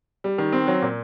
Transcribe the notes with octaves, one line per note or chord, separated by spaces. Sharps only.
G3
D#3
C4
F#3
A#2